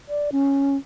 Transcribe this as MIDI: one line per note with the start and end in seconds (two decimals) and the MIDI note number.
0.09 0.30 74
0.32 0.77 61